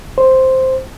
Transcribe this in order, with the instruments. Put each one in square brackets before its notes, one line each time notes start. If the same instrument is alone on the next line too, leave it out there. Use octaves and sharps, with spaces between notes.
[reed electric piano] C5